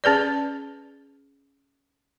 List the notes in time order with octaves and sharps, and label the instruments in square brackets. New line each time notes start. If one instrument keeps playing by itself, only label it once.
[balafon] C#4 G#4 B4 D5